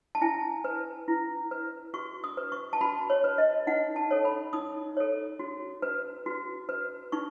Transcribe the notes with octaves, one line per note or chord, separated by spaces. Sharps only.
A5
E4 G#5
B4
E4
B4
F#4 C#6
D#6
B4
C#6
A5
F#4 B5
C#5
B4
D#5
D#4 F#5
A5
A4 C#5
B5
D#4 D#6
A4 C#5
F#4
B4
F#4
B4
D#4 C#6